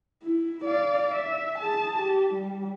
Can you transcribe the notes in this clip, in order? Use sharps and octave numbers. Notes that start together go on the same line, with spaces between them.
E4
D5 F5
E5
G#4 A5
G4
G3